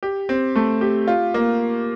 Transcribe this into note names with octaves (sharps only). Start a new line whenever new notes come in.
G4
C4
A3
G4
F4
A#3